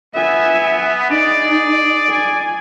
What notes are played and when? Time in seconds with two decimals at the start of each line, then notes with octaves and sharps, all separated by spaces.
0.14 B3 E5 G#5
1.09 D#4 G#4 D5
2.09 G#5